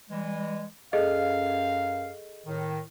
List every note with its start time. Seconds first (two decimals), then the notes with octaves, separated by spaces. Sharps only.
0.11 E3 G3 G#3
0.93 F#2 G#4 A4 D#5 F5
2.46 A2 D#3